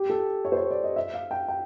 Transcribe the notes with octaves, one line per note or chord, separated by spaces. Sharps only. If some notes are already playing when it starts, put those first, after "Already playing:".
Already playing: G4
A4
C#5
C5
C#5
D5
D#5
E5
F5
G5
G5